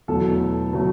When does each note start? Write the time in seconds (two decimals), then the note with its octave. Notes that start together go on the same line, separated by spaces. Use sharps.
0.08 E2 B2 F#3 A3 A4
0.73 B2 F#3 A3